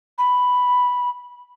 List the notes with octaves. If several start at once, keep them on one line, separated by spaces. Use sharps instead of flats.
B5